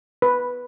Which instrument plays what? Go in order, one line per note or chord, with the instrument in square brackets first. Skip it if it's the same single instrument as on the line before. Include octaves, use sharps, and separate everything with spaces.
[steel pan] B4